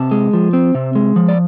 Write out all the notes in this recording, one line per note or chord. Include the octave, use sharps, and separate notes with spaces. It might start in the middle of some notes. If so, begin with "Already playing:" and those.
Already playing: C3 A5
G#3
F3
C4
C3
G#3
F3
D5